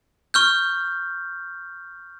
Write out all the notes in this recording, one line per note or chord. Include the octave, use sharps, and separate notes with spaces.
C#6 F6 G6